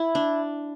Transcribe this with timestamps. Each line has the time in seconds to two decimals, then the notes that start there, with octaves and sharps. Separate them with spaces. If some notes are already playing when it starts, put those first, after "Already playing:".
Already playing: E4
0.15 D4